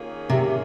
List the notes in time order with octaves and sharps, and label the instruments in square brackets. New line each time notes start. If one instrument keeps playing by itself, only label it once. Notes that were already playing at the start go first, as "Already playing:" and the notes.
Already playing: [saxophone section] D#3 A#3 C#4 F4 G#4
[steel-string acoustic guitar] C3